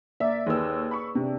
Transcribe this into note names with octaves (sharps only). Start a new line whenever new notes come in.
A#3 A#4 D5 E5
D#2 G#4 B4 E6
B5 C#6
C3 D4